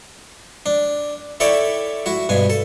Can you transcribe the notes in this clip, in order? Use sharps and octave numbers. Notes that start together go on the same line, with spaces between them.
D4
E4 A4 C#5 D5 E5 G5
E4 F#4
G2 B2 G#5
A4